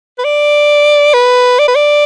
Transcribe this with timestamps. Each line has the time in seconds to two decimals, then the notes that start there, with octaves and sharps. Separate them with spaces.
0.18 B4
0.24 D5
1.14 B4
1.59 D5
1.68 B4
1.75 D5